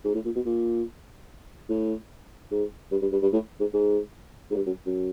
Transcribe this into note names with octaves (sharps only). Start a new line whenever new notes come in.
G#2
A2
A#2
B2
A#2
A2
G#2
G2
G2
G2
G2
A2
G#2
G#2
G#2
G2
F#2
F#2